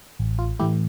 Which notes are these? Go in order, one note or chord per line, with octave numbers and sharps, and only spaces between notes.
A1
F4
A2 E3 A3 E4 G4